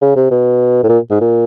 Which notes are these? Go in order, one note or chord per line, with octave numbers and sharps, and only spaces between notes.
C#3
C3
B2
A2
A#2
G#2
A#2